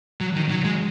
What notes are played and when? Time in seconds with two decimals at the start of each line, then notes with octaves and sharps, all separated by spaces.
0.21 F#3
0.36 D#3
0.50 F#3
0.64 G#3